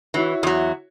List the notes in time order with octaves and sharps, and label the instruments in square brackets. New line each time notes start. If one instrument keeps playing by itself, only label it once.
[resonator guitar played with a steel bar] E3 [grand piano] E4 F#4 C#5
[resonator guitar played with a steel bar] E2 F#3